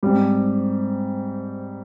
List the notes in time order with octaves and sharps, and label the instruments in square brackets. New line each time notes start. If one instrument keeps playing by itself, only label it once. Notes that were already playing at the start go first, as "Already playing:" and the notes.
[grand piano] G#2 G3 C4